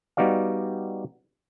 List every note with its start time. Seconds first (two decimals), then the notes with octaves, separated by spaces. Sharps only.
0.17 G3 B3 D#4 F#4 D5 F5